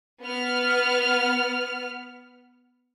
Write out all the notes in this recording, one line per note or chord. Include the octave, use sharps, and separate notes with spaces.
B3 F6